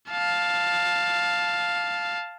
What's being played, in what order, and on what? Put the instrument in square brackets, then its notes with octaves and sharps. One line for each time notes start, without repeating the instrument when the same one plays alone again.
[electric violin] F5 A5